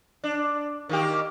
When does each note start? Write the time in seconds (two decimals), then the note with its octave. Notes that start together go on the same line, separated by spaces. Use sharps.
0.24 D4
0.89 D#3 A#3 G4